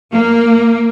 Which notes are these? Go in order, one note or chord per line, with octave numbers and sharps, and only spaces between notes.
A#3